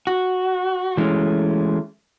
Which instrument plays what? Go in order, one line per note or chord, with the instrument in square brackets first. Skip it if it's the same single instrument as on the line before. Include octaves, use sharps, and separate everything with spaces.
[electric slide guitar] F#4
E3 G#3 A3 C#4